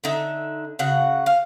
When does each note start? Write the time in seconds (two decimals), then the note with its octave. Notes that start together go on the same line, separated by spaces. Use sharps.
0.04 D3 D#4 E5
0.79 C#3 F#4 F#5
1.26 F5